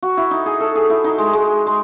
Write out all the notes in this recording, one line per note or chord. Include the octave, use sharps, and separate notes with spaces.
F#4
E4
D#4
G#4
A4
G#4
E4
D#4
G#3
G#3
G#3